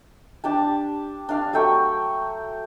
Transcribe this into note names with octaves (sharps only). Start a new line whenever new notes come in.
D4 G4 A5
D4 F5
F#3 A3 G5 C#6